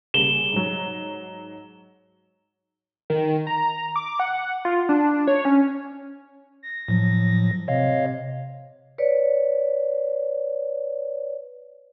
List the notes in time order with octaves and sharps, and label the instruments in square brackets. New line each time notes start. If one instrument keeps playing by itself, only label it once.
[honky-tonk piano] C#3 G3 A#3 [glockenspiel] E7 G7
[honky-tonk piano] G#2 F#3
[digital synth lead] D#3
A#5
D6
F#5
F4
D4
C#5
C#4
[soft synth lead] A#6
[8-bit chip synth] A2 F3 F#3
[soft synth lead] C3 [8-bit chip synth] C#5 D#5 F5
[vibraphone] B4 C#5 D5